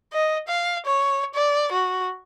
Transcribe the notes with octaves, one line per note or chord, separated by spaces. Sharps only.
D#5
F5
C#5
D5
F#4